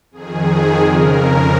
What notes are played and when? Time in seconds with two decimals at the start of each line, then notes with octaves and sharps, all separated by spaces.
0.11 F2 D#3 G#4
0.77 F2 C#3 A#4